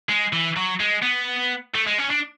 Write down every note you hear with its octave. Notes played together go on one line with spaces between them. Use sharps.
G#3
E3
F#3
G#3
B3
A3
G#3
C#4
D4